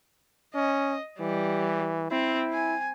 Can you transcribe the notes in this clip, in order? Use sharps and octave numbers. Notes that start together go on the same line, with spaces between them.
C#4 D#5
E3 G3
C4 E4
G#5